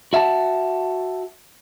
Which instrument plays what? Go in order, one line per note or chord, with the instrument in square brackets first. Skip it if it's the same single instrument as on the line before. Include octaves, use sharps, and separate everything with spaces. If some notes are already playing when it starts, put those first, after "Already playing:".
[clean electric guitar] F#4 E5 F#5 A5